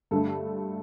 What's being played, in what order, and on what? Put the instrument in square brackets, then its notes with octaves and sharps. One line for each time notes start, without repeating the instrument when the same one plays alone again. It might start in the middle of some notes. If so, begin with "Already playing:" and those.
[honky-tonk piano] G2 D3 A3 A4